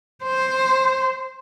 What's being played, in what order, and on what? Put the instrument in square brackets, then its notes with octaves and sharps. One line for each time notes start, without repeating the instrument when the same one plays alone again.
[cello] C5